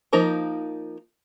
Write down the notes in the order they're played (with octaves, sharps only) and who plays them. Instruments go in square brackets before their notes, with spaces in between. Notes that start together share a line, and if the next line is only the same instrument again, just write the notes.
[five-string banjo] F3 A#3 D#4 A#4 C5